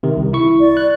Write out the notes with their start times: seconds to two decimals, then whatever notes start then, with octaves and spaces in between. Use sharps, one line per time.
0.03 C3 D#3
0.17 C2
0.33 E4 C#6
0.60 D5
0.77 F#6